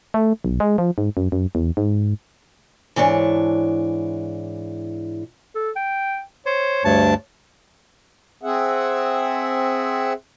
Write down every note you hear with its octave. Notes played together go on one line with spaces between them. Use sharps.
A3
B1
G#3
F3
G#2
F#2
F#2
E2
G#2
G#2 E3 D4 C#5
A4
G5
C5 C#5
D2 G2 A5
C4 G#4 E5 F#5